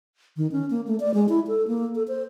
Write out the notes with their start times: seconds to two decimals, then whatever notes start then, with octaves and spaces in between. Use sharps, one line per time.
0.37 D#3
0.52 C#4
0.70 A#3
0.87 A3
1.00 D5
1.14 G#3
1.29 E4
1.47 A4
1.68 A#3
1.95 A4
2.08 C5